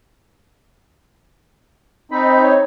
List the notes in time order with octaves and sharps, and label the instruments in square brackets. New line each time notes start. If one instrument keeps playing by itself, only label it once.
[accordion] C4 D#4 [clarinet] B5
[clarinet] C#5